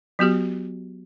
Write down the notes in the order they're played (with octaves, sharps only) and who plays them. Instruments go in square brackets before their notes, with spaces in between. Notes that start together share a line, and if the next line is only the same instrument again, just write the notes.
[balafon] F#3 B3 F#4 G4